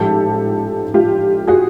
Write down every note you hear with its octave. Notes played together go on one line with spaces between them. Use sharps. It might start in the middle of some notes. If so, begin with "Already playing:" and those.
Already playing: A1 G#2 F3 G#3 G4 A4
F4 G4
F#4 G#4